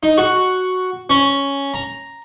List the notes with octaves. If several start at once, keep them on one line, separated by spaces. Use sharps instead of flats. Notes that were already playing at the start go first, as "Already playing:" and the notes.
D#4
F#4
C#4
A#5